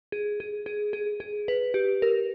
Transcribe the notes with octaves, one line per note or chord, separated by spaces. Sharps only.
G#4
G#4
G#4
G#4
G#4
B4
G4
A#4